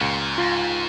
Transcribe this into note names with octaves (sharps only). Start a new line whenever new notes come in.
C#2 A#2
G#2 F4